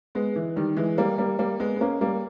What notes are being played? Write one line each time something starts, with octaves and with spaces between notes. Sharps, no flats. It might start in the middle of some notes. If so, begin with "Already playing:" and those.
G#3 B3
E3
D#3 G3
E3 G#3
G3 A#3
G3 A#3
G3 A#3
G#3 B3
B3
A#3 C#4
G3 A#3